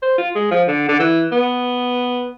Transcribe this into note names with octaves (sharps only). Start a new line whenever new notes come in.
C5
F4
G#3
F3
D3
D3
E3
B3